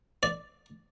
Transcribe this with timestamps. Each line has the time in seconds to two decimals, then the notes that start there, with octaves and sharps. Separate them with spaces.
0.23 D5